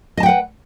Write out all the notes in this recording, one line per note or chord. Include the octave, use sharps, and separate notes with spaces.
B4 D#5 F#5 G5 A5